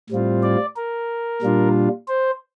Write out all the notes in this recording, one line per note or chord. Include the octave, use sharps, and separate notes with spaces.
A2 G3 C4 F4
D5
A#4
A#2 G3 D4 F4
C5